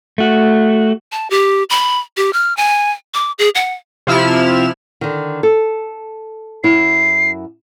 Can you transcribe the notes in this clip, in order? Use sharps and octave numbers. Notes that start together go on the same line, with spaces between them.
A3 F#4
A5
G4
B5
G4
F6
G#5
D6
G#4
F#5
C3 F3 E4 F6 E7
D3 D#3
A4
F#2 E4 C7